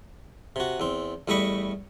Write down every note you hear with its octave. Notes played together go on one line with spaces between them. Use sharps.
C3 F#4
E2 C4
E2 G3 A3 D#5 B5 C#6